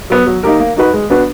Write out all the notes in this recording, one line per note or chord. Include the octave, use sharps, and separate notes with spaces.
F#3 B3
F#3
A#3 D#4 G4 A#4
A#3
D#4 F#4 B4
G#3
B3 D4 F#4 B4